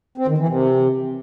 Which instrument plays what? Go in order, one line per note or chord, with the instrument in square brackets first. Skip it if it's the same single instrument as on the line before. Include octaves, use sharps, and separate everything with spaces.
[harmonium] C4
D#3
E3
C3